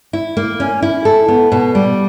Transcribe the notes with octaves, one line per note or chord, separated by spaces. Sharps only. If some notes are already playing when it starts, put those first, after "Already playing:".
E4
A#3
C#4
E4
A4
B3
B2
G3